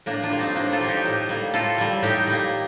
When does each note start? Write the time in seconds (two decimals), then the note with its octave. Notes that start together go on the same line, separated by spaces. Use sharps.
0.06 A2 A#3 D4
0.23 D4 F4
0.31 G3 A#3
0.39 C4 D#4
0.55 A2 A#3 D4
0.72 F4 A4
0.81 G3 A#3
0.88 D#4 G4
1.05 A2
1.29 G3 A#3
1.54 A2 F4 A4
1.78 G3 A#3
2.02 A2 D#4 G4
2.27 G3
2.32 A#3